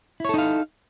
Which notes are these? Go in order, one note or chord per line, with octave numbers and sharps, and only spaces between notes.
D#4 E4 A4 C#5 F5